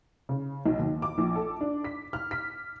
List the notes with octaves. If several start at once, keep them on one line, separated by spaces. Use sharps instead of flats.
C#3
B1
D#2
D6
A#1
A4
D4
B6
F6
B6